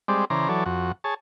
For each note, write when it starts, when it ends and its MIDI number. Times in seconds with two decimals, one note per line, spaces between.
0.08 0.25 55
0.08 0.25 56
0.08 0.25 60
0.08 0.25 74
0.30 0.49 49
0.30 0.49 52
0.30 0.49 72
0.30 0.49 74
0.30 0.49 82
0.49 0.64 52
0.49 0.64 54
0.49 0.64 69
0.49 0.64 73
0.49 0.64 74
0.66 0.92 41
0.66 0.92 66
1.04 1.14 68
1.04 1.14 73
1.04 1.14 81